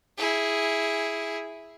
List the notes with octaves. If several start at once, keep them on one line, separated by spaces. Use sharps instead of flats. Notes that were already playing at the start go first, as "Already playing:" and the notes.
E4 G#4